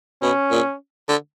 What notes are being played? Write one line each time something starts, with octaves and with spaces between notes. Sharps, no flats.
B2 C#4
A#2
D3